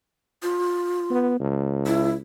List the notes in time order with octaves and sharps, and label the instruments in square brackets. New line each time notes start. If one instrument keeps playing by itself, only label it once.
[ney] F4
[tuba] B3
C#2
[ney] E4